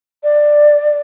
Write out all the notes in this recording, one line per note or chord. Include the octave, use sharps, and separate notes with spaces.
D5